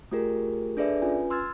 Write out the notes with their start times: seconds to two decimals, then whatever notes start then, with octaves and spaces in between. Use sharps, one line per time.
0.11 A3 F4 G4 G#4 A#4
0.77 D4 G#4 A4 B4 D5 E5
1.02 C#4 F4 B4 G#5
1.30 C6 E6 F6 G#6 A6